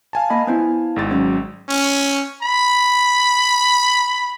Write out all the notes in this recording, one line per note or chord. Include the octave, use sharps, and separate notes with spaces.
F5 G#5 A5
A#3 D#5 B5
B3 C4 E4
G#1 G#2 A6
F#3 C#4
C#4
B5